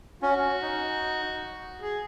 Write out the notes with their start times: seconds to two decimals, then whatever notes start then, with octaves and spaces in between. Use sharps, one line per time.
0.22 C#4 F#4
0.62 D#4
1.81 G#4